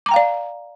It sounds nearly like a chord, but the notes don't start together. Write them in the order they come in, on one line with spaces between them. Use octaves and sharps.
D6 A#5 G5 F5 D5